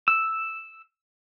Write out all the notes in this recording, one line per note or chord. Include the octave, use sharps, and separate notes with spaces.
E6